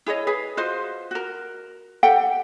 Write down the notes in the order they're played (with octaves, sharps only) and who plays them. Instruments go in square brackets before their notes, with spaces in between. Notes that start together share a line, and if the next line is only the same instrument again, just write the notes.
[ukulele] E4 G#4 C#5 D#5
G#4 B4
F4 F#4 C5 D#5
F#4 A#4
G4 A4 F#5 G5